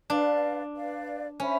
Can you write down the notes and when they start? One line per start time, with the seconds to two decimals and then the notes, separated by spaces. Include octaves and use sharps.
0.10 D4 B4 D5 F5
0.75 B4 D5 F5
1.40 C#4 C5 E5 G#5 B5